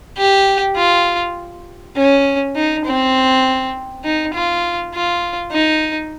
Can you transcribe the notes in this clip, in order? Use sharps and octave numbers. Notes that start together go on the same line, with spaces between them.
G4
F4
C#4
D#4
C4
D#4
F4
F4
D#4